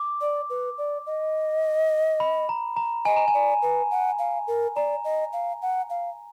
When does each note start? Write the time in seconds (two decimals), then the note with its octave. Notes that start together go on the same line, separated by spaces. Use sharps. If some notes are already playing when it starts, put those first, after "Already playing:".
Already playing: D6
0.21 D5
0.50 B4
0.78 D5
1.07 D#5
2.20 B5
2.49 A#5
2.77 A#5
3.05 D#5 G#5
3.16 A#5
3.28 G#5
3.34 D5
3.62 B4
3.91 F#5
4.19 F5
4.48 A#4
4.76 D5 A#5
5.05 D#5
5.33 F5
5.62 F#5
5.90 F5